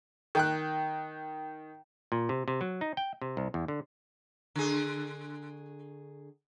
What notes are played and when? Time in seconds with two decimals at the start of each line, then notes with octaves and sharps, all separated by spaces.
0.35 D#3 G5 F#6
2.12 A#2
2.29 C3
2.48 C3
2.61 F#3
2.81 D#4
2.97 G5
3.22 C3
3.37 C2
3.54 E2
3.68 D3
4.56 D3 G#4